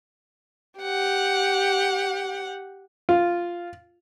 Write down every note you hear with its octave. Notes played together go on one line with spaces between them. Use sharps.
G4 F#5
F4